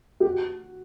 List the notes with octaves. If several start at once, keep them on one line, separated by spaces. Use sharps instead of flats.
G4
F#4